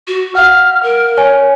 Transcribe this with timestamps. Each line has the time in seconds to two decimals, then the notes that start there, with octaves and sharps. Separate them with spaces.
0.08 F#4
0.35 F5 F#5 F6
0.83 A#4
1.17 C#5 G#5